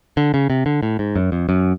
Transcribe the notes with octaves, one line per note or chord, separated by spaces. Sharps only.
D3
C#3
C3
D3
A2
G#2
F#2
F2
F#2